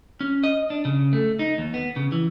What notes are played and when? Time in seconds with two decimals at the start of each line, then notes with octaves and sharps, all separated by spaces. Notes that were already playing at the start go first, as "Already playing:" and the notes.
0.21 C#4
0.44 D#5
0.70 D4
0.85 C#3
1.13 A3
1.39 D#4
1.58 D#2
1.74 B3
1.96 C#3
2.12 E3